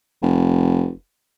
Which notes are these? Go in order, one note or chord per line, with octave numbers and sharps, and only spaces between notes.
F1